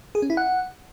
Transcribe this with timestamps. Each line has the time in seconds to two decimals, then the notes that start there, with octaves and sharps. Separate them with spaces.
0.15 G#4
0.22 C#4
0.30 E4
0.37 F#5